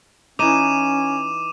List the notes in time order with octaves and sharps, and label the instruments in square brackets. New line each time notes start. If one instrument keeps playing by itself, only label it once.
[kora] E3 D#4 [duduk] C#4 [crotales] D6 D#7 E7